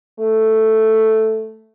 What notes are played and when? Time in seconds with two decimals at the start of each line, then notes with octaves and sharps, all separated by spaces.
0.19 A3